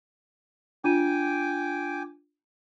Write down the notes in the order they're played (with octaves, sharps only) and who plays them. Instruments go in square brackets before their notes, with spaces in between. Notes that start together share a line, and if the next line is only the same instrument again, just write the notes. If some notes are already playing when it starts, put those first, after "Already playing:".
[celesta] D4 F4 D#7 [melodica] G5 G#5 D6